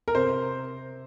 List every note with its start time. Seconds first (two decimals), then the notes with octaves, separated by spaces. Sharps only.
0.08 A#4
0.15 C3 C5